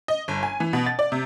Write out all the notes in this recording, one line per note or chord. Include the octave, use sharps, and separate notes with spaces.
D#5
G1
G#5
E3
B2
A6
D5
C3